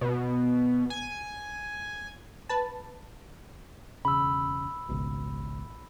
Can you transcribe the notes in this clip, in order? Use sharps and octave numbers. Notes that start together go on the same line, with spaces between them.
B2
G#5
B4 A5
E1 C#3 B5 E6
G#1 C#2 B2